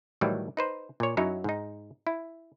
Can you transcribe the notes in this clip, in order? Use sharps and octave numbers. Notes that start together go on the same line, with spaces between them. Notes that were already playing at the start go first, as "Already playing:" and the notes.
A2 D#3 E3 F#3 G3
D#4 B4 C5
A#2 C#5
F#2 F#3 D#4 E4 F#4 C#5
G#2 D#4
E4